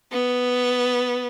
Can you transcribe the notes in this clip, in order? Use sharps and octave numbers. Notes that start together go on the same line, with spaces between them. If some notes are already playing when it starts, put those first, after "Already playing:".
B3